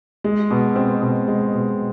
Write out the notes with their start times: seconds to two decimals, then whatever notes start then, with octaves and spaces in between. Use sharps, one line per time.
0.24 G#3
0.50 B2
0.76 C4
1.01 B2
1.28 G#3
1.53 B2